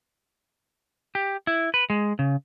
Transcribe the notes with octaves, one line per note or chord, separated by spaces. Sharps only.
G4
E4
B4
G#3
C#3